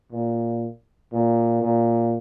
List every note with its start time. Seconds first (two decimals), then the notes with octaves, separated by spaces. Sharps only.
0.12 A#2
1.13 A#2
1.62 A#2